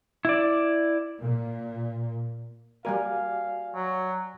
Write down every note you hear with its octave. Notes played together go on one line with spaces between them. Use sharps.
E4 D5
A#2
G3 A#3 F#4 A#4 D5 F5 G#5
F#3